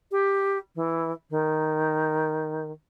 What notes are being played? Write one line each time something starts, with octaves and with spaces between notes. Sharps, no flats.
G4
E3
D#3